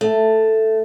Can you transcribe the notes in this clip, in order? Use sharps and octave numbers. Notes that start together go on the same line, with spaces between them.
A3